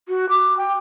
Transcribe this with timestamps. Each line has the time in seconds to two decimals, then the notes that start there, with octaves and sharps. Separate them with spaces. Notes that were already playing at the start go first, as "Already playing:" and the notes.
0.08 F#4
0.29 D6
0.57 G5